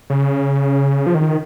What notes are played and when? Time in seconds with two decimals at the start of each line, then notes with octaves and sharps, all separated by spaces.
0.10 C#3
1.06 F3
1.15 D#3